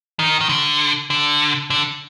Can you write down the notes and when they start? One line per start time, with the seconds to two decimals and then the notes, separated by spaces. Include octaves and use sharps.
0.19 D#3
0.41 D#3
0.49 D3
1.10 D3
1.70 D3